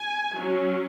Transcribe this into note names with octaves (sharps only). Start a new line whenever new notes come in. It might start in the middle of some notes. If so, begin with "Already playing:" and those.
Already playing: G#5
F#3
C#4